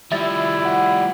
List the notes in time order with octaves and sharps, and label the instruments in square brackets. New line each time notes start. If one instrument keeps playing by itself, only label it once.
[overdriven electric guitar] F3 G3 [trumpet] E4 [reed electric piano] E5 A6
[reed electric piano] F#5